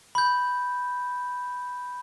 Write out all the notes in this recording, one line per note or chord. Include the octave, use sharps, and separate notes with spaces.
B5 G6